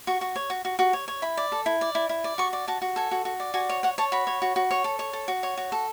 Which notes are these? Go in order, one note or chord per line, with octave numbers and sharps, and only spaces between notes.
F#4 C#6
F#4
C#5
F#4
F#4
F#4
C#5
C#5
E4 B5
D5
A4
E4
D5
E4
E4
D5
F#4 C#6
D5
F#4 A5
F#4
A4 G#5
F#4
F#4
D5
F#4 G#5
C#5
C#5 F#5
C#5 A5
F#4 B5
C#5
F#4
F#4
C#5
A4
C#5
A4
F#4
C#5
F#4
A4